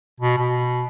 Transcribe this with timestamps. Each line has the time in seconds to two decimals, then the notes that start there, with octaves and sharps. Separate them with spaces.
0.21 B2
0.38 B2